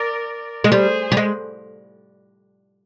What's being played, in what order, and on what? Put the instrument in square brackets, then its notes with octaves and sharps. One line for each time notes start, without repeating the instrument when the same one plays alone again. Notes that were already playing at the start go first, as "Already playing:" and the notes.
Already playing: [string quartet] A#4 D5
[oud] G#3
[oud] G3 [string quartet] G#4 C5
[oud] G3
G#3